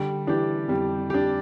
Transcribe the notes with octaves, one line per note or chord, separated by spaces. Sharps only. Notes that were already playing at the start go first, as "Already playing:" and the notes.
Already playing: D3 G3
E3 D4 G4
F2 G3
D4 G4